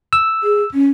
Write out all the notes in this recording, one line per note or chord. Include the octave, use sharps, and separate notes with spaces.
E6
G#4
C#4